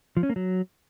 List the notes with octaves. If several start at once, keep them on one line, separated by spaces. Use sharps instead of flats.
F3
C#4
A#3
F#3